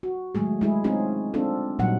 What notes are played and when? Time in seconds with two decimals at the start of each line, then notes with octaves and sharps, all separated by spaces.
0.03 F#4
0.35 D#3 F#3 G#3 A3 G#4
0.61 G#3 E4 G#4
0.84 C4 C#4 D#4 F4 G#4
1.34 C4 D4 F4 A4
1.79 A#2 F#3 G3 D#4 F#5